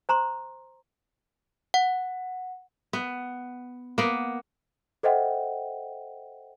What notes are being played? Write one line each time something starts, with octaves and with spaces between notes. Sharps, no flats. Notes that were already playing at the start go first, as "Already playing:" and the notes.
C5 A#5 C6
F#5
B3
A#3 B3
A4 C5 D#5 E5 F#5 G5